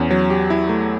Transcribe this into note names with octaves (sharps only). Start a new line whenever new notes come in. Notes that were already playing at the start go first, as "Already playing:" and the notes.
Already playing: E2 C#4
F#3
G4
E4
A3